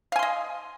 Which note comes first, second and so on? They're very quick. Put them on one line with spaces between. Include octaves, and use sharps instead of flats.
F5 G#5 C6 D#5